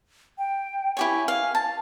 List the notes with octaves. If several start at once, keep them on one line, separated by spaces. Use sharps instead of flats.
G5
E4 G4 C#5 G#5
F5
A5